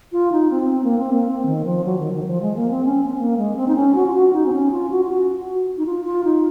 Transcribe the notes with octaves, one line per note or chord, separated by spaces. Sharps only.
F4
D#4
C4
C4
A#3
C4
A#3
C4
D#3
F3
F#3
D#3
D#3
F#3
F3
G#3
A#3
C4
C#4
C4
A#3
G#3
C4
D#4
C#4
F#4
F4
F#4
D#4
C4
C#4
F4
F#4
F4
F#4
D#4
F4
F4
D#4